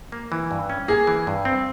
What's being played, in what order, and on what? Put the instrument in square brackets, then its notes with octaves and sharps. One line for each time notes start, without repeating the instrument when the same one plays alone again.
[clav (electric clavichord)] A#3
E3
G2
C#4
[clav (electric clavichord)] A#3 [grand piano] G#4
[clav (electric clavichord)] E3
G2
C4